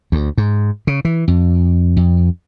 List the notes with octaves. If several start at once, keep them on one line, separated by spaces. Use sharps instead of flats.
D2
G#2
C#3
E3
F2
F2